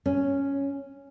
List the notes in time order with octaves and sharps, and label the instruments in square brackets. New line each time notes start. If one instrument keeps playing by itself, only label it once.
[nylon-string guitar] C#4